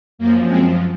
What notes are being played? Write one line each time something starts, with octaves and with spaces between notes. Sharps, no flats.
F#2 F3 A#3
G#3 C4